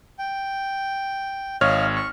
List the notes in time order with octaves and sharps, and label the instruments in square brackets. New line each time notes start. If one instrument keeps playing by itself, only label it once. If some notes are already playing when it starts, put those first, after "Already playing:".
[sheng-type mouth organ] G5
[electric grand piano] G#1 C#5 F6 [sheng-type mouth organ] D#5 F5
[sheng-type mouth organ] C#6